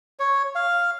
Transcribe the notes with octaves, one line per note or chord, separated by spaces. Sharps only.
C#5
F5